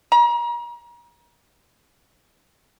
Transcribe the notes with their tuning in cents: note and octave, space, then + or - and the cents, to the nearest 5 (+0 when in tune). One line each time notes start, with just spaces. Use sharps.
A#5 +35